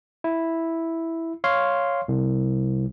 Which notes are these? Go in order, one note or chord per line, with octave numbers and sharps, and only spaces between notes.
E4
C#5 F5 C6
C2